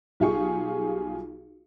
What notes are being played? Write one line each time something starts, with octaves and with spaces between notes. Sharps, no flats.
B1 G3 F4 G4 G#4 C#6